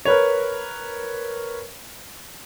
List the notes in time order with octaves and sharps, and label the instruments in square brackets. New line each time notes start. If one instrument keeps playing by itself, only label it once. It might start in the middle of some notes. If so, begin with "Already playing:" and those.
[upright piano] A#4 B4 C#5